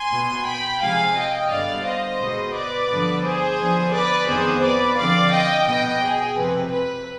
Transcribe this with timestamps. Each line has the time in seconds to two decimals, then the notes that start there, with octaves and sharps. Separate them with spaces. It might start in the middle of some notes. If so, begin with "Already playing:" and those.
Already playing: G#5 C6
0.11 B2 B3
0.46 G5 B5
0.80 C3 F3 G#3 C4 F5 G#5
1.16 D#5 G5
1.50 G2 D3 G3 B3 D5 F5
1.85 C5 D#5
2.19 B2 G#3 B3
2.54 B4 D5
2.88 G2 D3 F3 B3
3.23 G#4 C5
3.58 D3 F3 B3
3.93 B4 D5
4.28 F2 D#3 B3 G#4 C5
4.63 B4 D5
4.97 D3 F3 C4 D5 F5
5.31 D#5 G5
5.67 B2 B3 D#5 G5
6.02 G#4
6.37 F2 C3 F3 C4 B4
6.70 B4